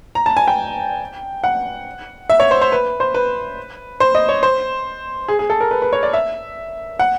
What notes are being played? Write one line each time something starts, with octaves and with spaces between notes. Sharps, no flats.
A#5
A5
G#5
G5
F#5
E5
C#5
C5
C5
B4
C5
B4
C5
D#5
C#5
C5
G#4
G#4
A4
A#4
B4
B4
C#5
D5
E5
F#5